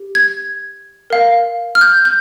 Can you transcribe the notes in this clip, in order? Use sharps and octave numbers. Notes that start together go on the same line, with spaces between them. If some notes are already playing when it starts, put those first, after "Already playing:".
Already playing: G4
G#6
A#4 F5
F6
G6
G6